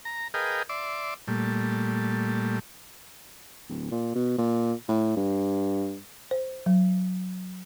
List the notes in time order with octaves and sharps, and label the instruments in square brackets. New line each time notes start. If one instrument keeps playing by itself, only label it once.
[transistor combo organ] A#5
G#4 A#4 B4 D#5 F5 G5
D5 E5 C6 D6
A#2 G3 A3
[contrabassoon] D1
A#2
B2
A#2
A2
G2
[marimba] C5
F#3